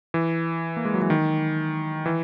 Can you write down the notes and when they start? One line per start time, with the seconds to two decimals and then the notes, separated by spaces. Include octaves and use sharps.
0.14 E3
0.77 A#3
0.85 G#3
0.94 F#3
1.02 E3
1.10 D#3
2.06 E3